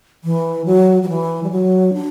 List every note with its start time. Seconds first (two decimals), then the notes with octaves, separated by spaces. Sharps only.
0.24 E3
0.66 F#3
1.03 F#3
1.09 E3
1.43 G3
1.51 F#3
1.93 D4